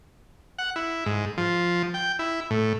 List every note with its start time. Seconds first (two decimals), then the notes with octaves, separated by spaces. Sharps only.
0.59 F#5
0.76 E4
1.06 G#2
1.38 F3
1.94 G5
2.19 E4
2.51 A2